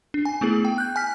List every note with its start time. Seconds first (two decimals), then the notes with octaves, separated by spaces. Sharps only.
0.14 D4
0.25 G#5
0.41 A3 B3 E4 G#4
0.65 G5
0.78 F#6 G6
0.96 G#5 F6 B6